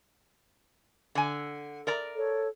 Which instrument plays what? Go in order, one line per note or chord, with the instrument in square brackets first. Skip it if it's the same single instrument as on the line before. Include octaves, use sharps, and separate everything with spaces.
[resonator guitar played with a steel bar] D3 G#5
A#4 D5 A#5
[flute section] A4 C#5